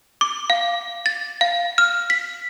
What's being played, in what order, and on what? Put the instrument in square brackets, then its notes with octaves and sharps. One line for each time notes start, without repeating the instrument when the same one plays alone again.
[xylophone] D6
F5
A6
F5
F6
B6